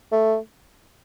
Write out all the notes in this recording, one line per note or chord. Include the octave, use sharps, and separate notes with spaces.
A3